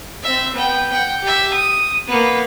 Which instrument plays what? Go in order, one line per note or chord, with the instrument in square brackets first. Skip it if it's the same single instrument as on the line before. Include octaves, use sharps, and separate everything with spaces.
[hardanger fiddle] C4 E5
B3 G5
F#5 G5
G4 E5
D#6
A#3 B3